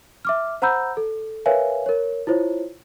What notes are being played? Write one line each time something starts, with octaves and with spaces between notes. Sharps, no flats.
E5 D6 F6
C5 F#5 A#5 B5 E6 G6
A4
A#4 B4 C#5 E5 F5 G#5
A#4 C#5
E4 F4 C5 C#5